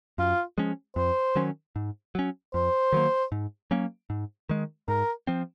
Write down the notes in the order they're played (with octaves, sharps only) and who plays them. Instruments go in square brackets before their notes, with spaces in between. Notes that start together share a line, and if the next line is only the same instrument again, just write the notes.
[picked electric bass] F#2 [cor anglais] F4
[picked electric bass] F3 G#3 C#4
[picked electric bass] F2 [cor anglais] C5
[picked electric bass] D#3 F#3 C#4
G#2
F#3 C#4
[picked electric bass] F2 [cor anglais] C5
[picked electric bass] D#3 F#3 A#3
G#2
F#3 A#3 C#4
G#2
D#3 G#3
[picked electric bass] G#2 [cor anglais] A#4
[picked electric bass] F3 C4